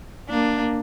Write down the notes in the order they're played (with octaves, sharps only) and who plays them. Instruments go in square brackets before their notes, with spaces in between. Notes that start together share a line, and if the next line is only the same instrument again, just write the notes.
[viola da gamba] A#3 D4